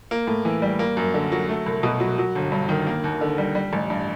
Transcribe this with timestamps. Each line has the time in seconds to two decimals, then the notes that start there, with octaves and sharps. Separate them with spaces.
0.11 A#3
0.27 A2
0.45 E3
0.62 G3
0.79 A#3
0.97 F#2
1.14 D3
1.32 F#3
1.49 A3
1.66 C2
1.83 B2
2.00 F#3
2.18 F#3
2.35 G1
2.52 G2
2.69 D#3
2.87 A#3
3.04 D#2
3.21 D3
3.38 G3
3.55 G3
3.73 A1
3.90 G2